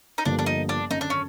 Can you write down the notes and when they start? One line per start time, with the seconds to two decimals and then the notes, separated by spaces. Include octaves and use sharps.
0.18 D#4
0.25 G1 G2 D3 F3 A#3 D4
0.39 D4
0.46 D#4
0.69 D4
0.90 G#1 F#2 D3 D#4
1.01 D4
1.10 C#4